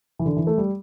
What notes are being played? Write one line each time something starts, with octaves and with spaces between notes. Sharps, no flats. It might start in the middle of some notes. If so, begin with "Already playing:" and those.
E3
D3
E3
A3
G3